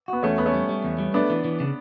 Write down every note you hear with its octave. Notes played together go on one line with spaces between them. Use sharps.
B3 F#4
E2 A3 C#4
E2 B3
A3 C#4
G3
G3
E2
G3
A3 B3 D4
E3
E3
C#3